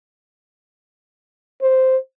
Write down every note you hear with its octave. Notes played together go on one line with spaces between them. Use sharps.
C5